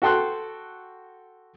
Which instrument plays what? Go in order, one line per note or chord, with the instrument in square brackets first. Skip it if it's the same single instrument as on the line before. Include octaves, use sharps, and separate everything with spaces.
[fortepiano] F#4 A4 G5 A5 C6 F#6